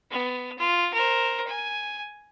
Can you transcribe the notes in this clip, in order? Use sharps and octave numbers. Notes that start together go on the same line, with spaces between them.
B3
F4
A#4 C5
G#5